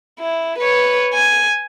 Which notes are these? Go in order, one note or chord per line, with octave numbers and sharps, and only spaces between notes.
E4
B4 C#5
G#5